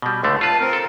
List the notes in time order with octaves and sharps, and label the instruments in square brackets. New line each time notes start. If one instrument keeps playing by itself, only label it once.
[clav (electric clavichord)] B2 G3
C#2 D3 A3
[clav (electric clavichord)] F4 B4 [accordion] A5
[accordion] C4 A#4
[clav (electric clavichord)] A4